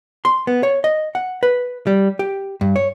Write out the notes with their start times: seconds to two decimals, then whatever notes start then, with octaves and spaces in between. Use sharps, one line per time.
0.25 C6
0.47 B3
0.63 C#5
0.84 D#5
1.15 F#5
1.43 B4
1.87 G3
2.19 G4
2.61 G2
2.76 C#5